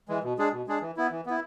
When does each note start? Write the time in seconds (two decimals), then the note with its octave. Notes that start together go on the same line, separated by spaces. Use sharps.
0.09 E3 G#3
0.23 B2
0.38 G#3 D4 G#4
0.53 B2
0.67 G#3 D4 G#4
0.81 E3
0.97 B3 E4
1.11 E3
1.26 B3 E4